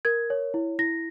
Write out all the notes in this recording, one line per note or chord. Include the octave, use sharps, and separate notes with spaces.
A#4 G#6
C#5
E4
E4 A#6